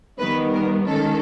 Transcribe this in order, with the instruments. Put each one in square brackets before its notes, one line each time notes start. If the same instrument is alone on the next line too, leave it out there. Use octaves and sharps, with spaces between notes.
[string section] D#3 G3 B3 B4
A#4
D#3 G#3 C#4 A4